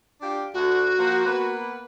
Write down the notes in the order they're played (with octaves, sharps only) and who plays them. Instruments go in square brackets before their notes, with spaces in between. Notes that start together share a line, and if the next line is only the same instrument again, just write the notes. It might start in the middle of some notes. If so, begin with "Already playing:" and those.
[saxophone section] D4 F4 G4
[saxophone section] D2 [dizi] F#4
[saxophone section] F3 A#3
A#3 B3 B4